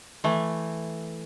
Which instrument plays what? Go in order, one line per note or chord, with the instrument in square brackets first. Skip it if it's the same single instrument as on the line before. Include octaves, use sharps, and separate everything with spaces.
[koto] E3 A3